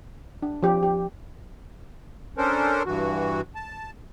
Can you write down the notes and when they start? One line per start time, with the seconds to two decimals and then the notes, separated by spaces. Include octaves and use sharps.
0.42 D4
0.63 F3 G4
0.83 G4
2.38 C#4 D4 A4 A#4 C5
2.86 G2 E3 F#4
3.55 A5